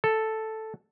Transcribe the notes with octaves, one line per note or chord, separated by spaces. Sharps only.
A4